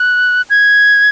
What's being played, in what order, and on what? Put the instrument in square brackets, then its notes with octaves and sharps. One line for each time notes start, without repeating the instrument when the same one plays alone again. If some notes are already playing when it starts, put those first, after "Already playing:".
Already playing: [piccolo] F#6
G#6